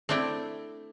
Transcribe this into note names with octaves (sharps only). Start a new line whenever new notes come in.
A3 C4 D4 E4 G5